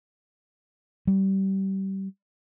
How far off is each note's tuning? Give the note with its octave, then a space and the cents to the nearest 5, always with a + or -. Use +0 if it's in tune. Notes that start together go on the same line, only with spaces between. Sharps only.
G3 -25